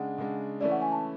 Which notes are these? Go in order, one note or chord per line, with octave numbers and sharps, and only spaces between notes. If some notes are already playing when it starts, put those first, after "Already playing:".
Already playing: C#3 G#3 D4 F#5
C#3 G#3 D4
E3 A3 C#4 E4 D5
F#5
G#5
A5